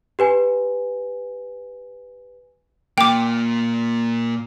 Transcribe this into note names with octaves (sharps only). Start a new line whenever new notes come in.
G4 B4 G#5
A#2 A#3 G5 D6